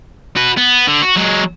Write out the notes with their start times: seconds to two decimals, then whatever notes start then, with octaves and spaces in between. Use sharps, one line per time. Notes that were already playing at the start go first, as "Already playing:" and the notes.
0.37 F#4 B4
0.58 B3
0.88 D3
1.02 F#4
1.16 F#3 G#3